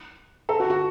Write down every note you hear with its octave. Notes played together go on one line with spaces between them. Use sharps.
A4
F#4
F#4